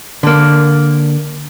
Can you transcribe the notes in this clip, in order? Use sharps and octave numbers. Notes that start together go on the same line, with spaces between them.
D3 A#3